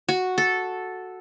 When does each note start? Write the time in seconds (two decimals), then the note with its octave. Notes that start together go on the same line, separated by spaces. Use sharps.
0.09 F#4
0.38 A4